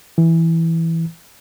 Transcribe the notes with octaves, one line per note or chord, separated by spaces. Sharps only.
E3